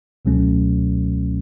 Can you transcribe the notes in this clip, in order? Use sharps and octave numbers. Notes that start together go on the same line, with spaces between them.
C#2 B2 F#3 A3 C#4